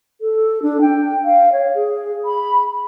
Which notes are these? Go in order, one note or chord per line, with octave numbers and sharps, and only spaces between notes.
A4
D4
G5
F5
C#5
G#4
B5